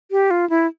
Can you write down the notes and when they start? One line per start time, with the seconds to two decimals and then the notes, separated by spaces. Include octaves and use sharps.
0.11 G4
0.31 F4
0.50 E4